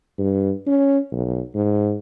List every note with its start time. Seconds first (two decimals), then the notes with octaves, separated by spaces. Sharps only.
0.19 G2
0.67 C#4
1.12 B1
1.55 G#2